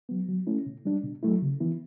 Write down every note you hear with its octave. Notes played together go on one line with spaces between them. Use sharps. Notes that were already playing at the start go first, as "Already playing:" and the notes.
F#3 B3
F#3
A3 C#4 E4
B2
G3 D4
B2
F#3 A3 E4
C#3
E3 B3 E4